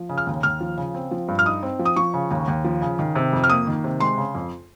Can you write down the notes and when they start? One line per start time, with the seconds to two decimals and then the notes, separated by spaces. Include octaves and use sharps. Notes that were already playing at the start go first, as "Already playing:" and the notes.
Already playing: F3
0.09 C#3
0.18 F6
0.27 D#2
0.43 D#2 F6
0.61 F3
0.77 C#3
0.95 C4
1.11 F3
1.28 G2
1.39 F6
1.46 D#4 D#6
1.63 C4
1.79 F3
1.85 D#6
1.96 F3 C#6
2.14 C#3
2.31 D#2
2.48 D#2
2.65 F3
2.82 C#3
2.99 D#3
3.15 C3
3.33 F2
3.44 F6
3.50 A#3 D#6
3.67 D#3
3.84 C3
4.00 G#3 C6
4.18 C#3
4.35 F2